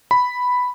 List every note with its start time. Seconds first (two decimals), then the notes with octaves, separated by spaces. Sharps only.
0.11 B5